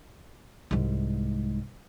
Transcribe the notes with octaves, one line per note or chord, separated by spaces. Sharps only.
C2 G#2